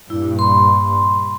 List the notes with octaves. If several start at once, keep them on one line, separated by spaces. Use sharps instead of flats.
G2 A#2 E4
B5 C6